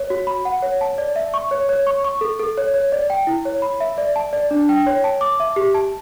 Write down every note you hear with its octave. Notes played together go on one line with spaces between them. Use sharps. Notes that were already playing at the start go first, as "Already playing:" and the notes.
Already playing: C#5
F#4
B5
F#5
C#5
A5
D5
E5
C#6
C#5
C#5
C#6
C#6
A4
A4
C#5
C#5
D5
G5
E4
C#5
B5
E5
D5
A5
D5
D4
G5
C#5
A5
D6
E5
G4
A5